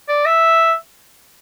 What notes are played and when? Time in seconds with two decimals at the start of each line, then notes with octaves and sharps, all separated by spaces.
0.09 D5
0.26 E5